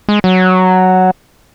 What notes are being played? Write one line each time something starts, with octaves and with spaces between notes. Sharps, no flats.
G#3
F#3